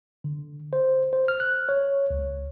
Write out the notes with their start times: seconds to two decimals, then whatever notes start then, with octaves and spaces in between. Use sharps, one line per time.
0.24 D3
0.73 C5
1.13 C5
1.28 F6
1.40 F#6
1.69 C#5
2.10 C#2